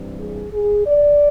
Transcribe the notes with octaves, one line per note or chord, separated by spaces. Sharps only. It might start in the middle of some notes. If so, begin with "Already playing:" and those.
Already playing: G2 E3 G3 C4
G#4
G#4
D5